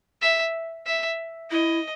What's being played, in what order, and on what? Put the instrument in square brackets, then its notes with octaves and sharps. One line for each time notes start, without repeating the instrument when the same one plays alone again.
[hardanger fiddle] E5
E5
[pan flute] E4 [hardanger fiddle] D#5